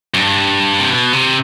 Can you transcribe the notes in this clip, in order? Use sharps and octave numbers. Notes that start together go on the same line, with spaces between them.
F#2
G2
C3
B2
C3